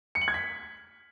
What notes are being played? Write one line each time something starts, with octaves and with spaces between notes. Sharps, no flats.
C#7
F#7
G#6
B6